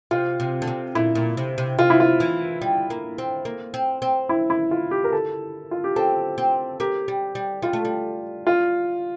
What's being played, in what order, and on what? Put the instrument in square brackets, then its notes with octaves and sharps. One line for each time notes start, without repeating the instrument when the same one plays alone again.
[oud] C3 [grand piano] F4
[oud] C3
D3
C3
[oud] A#2 [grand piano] E4
[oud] A#2
C3
C3
[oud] C3 [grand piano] F4
[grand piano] E4
F4
[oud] E3
G3
A#3
C4
A#3
C4
C4
[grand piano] E4
E4
F4
G4
A#4
A4
F4
G4
[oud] C4 [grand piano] A4
[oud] C4
[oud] A#3 [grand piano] G4
[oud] G3
G3
[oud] G3 [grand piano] F4
[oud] A3
G3
[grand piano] F4